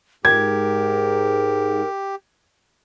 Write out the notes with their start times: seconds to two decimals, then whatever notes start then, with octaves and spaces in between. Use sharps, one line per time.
0.25 G#2 G4 A#4 G#6